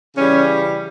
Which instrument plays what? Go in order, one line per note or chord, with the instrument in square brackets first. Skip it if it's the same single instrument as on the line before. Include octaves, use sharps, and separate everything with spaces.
[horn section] C#3 E3 G3 C#4